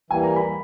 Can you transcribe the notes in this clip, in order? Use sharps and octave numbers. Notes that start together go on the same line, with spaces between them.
E3 G3 A#3 G#5
A#5
B5